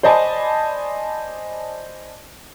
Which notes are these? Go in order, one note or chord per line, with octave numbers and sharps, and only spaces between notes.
C5 D5 D#5 G#5 A5 B5